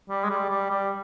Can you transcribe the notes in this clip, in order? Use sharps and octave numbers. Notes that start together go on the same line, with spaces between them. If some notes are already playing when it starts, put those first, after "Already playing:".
G3
G#3
G3
G3
G3